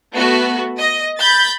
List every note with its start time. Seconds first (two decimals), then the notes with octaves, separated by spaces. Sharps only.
0.13 A3 B3 F#4
0.80 D#5
1.18 B5 G6 A6